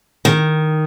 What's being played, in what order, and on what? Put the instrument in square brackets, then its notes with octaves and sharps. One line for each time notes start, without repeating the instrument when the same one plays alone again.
[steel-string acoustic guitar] D#3